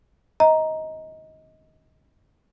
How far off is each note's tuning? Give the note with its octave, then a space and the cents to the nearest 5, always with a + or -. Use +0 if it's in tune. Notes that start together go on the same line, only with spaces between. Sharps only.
D#5 +20 A#5 +5